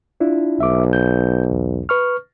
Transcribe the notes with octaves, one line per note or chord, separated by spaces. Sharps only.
D4 E4 F4
B1 E5 D6
G6
E2
B4 C#6 F6